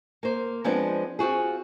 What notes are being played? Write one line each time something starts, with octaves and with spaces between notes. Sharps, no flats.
A#3 C5
F3 G#3 B3 C4 D4
C4 F4 F#4 G#4